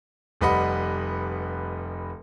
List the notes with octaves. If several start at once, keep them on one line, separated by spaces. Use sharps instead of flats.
F1 G3 B4 D#5 F#5 B5